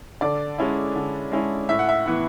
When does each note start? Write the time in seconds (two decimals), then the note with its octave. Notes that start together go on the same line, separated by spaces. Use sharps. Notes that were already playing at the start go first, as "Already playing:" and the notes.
0.21 D3 D5
0.58 G#3 C#4 E4
0.96 D3
1.32 G#3 C#4 E4
1.69 A2 E5
1.79 F#5
1.89 E5
2.06 E3 B3 E4